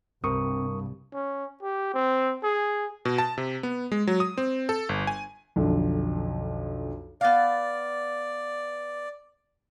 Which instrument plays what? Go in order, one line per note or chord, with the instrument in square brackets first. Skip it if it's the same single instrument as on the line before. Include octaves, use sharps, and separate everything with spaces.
[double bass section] C2 [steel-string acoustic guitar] G2 [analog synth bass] C4 [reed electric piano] A#4 C#6 D#6
[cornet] C#4
G4
C4
G#4
[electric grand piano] B2
A5
C3
B3
G#3
F#3
D#6
C4
A4
G1
G#5
[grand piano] B1 F2 D3
[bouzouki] B3 F5 [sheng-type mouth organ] D5